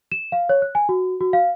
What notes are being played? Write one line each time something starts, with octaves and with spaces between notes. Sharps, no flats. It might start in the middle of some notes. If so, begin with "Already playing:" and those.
E7
F5
C#5
F#6
G#5
F#4
F#4
F5